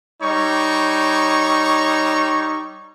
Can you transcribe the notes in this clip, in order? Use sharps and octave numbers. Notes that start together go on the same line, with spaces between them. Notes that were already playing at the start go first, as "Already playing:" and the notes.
G3 D#4 C#5 C#6